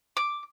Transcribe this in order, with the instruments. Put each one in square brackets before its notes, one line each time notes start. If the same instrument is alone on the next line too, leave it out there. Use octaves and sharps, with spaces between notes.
[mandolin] D6